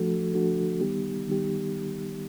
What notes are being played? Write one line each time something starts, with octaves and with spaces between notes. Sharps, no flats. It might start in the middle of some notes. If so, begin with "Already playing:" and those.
Already playing: F3 A3 D4 F#4 A4
F3 A3 D4 F#4 A4
D#3 G3 B3 D#4 G4
D#3 G3 B3 D#4 G4